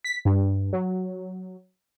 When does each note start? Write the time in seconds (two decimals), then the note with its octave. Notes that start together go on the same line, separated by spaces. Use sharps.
0.04 B6
0.25 G2
0.73 F#3